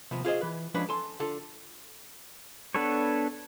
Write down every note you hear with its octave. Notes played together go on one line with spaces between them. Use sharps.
D#2 C3 F3 B3
F4 G#4 C5 D#5
E3 B4
F3 G#3 C#4 D4 B4
A4 G#5 C6
D3 F4 A4
B3 D4 A4 B4 C#5